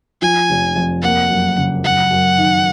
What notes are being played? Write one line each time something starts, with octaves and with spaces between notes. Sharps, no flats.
F3 G#5
F1
F2
A#3 F#5
F#2
C#3
F#2 F#5
F#2
D#3